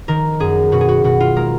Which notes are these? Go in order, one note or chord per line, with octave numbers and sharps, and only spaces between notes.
D#3 A#4
F#2 G#4
B2 F#4
G#4
F#4
B2 F#4
F4
G#3 A#4